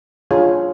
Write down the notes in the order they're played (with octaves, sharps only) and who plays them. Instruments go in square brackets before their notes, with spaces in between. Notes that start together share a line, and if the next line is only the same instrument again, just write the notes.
[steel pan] D4 F4 G#4 C#5